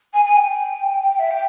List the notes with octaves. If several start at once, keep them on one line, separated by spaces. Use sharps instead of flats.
G#5
G#5
G5
E5
G5